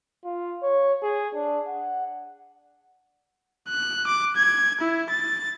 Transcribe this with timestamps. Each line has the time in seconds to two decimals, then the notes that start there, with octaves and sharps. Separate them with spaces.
0.25 F4
0.62 C#5
1.02 G#4
1.34 D4
1.66 F#5
3.69 F#6
4.07 D6
4.36 G#6
4.81 E4
5.10 A6